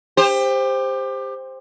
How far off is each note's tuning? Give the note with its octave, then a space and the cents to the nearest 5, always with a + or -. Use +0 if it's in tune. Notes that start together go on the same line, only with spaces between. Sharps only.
G4 +25 C5 +0